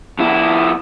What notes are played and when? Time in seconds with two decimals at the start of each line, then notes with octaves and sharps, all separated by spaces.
0.19 F2 E4